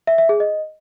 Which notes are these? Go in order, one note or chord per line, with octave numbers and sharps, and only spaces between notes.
E5
E5
G#4
D#5